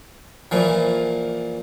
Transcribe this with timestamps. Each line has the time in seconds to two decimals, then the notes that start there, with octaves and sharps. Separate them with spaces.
0.51 A#2 E3 F3